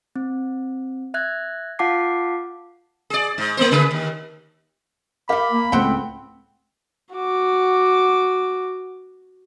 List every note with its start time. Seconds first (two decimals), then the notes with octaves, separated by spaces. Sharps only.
0.16 C4
1.14 E5 F#6 G#6
1.79 F4 F5 F#5 A5 D6 C7
3.10 G#4 D5
3.38 G#2
3.57 A3 B3 C5
3.71 C#3 G#4 B4
3.91 D#2
5.29 G3 G4 A#4 F5 B5
5.51 A#3
5.72 C#2 A2 C4 C5 F#5 G5
7.14 F#4 D6